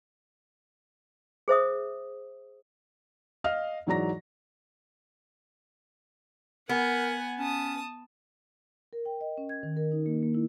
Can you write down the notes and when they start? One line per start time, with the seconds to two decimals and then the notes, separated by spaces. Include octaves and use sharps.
1.48 G#4 C5 E5 D#6
3.44 D#5 F5 F6
3.87 G#2 E3 F#3 D5 A#5 A#6
6.69 B3 A#4 F#5 G#5
7.39 C#4 A5 D#6
8.93 A#4
9.06 G5
9.21 D#5
9.38 C#4
9.49 G#6
9.63 D#3
9.77 A#4
9.92 D#4
10.06 A#3
10.23 A#3
10.35 E4